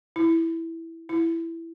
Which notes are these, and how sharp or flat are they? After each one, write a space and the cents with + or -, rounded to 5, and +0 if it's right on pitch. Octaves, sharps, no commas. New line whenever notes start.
E4 +0
E4 +10